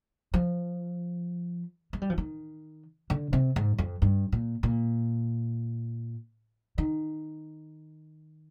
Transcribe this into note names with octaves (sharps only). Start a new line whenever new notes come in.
F3
G#3
G3
F3
D#3
D3
C3
G#2
F2
G2
A#2
A#2
D#3